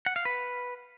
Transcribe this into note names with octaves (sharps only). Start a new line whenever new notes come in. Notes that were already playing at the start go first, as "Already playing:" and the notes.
F#5
F5
B4